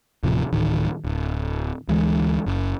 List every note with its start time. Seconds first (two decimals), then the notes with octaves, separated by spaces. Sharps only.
0.23 D#1 A2 C3 F3
0.53 D1 A1 D#3
1.05 D1
1.89 D2 E3 G#3
2.47 F#1